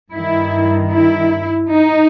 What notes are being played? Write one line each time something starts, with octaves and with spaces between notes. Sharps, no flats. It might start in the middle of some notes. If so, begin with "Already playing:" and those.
G2 D#3 E4
E4
D#4